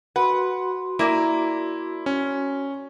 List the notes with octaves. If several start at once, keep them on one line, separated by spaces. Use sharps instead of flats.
F#4 B4 F#5 C6
A#3 E4 D5
C#4